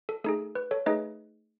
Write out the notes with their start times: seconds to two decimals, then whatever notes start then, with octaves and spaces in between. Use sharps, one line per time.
0.09 A4
0.24 A3 D#4 G#4 A4
0.55 B4
0.71 A4 C#5
0.86 A3 D#4 G#4 B4 D#5